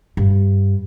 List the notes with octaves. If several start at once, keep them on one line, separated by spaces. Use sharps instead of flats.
G2